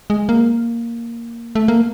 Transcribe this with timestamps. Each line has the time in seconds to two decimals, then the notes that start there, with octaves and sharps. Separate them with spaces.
0.10 G#3
0.29 A#3
1.55 A3
1.68 A#3